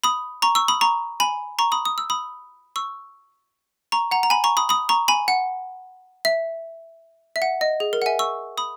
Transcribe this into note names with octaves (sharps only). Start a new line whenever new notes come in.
B5 D#6
A#5 C#6
C#6 E6
B5 D#6
A#5 C#6
G#5 B5
A#5 C#6
B5 D#6
D#6
E6
B5 D#6
C#6 E6
A#5 C#6
F#5 A#5
A#5
G#5 B5
A#5 C#6
B5 D#6
B5 D#6
A#5 C#6
G#5 B5
F#5
E5
E5
F#5
D#5
G#4
A#4
F#5
E5 G#5
C#6 E6
B5 D#6